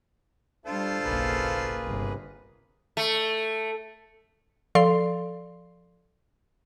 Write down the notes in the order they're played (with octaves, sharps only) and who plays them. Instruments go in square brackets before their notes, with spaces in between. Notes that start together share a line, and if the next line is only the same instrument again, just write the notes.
[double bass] G3 D4 [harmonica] F4 A4 C5
[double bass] F#1 B1 [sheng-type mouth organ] A#3 G#4 B4
[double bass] G1 C3
[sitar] A3
[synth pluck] F3 A4 D5 F5 C6 C7